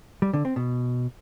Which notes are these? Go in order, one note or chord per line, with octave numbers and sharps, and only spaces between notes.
G3
D3
C4
B2